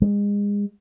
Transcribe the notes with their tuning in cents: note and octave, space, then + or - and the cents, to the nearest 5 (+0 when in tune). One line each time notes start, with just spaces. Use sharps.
G#3 -30